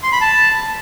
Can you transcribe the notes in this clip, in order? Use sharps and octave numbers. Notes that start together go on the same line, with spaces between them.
C6
B5
A5